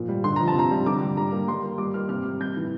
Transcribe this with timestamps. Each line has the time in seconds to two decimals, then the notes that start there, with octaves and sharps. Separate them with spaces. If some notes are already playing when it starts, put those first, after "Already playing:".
Already playing: A#2 F3
0.08 G3
0.24 D3 C6
0.36 F3 A#5
0.48 A5
0.55 C3 A#5
0.71 G3
0.86 D3 D6
1.01 G3
1.17 G3 A#5
1.32 A#3
1.48 G3 C6
1.64 A#3
1.78 G3 D6
1.94 A#3 F6
2.09 C3 F6
2.25 G3
2.40 C3 G6
2.56 E3